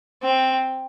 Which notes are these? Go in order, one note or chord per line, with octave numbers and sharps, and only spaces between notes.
C4